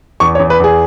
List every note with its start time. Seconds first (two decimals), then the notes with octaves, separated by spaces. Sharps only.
0.20 E2 C#6
0.35 C#5
0.39 E2
0.50 B4
0.60 E2 G#4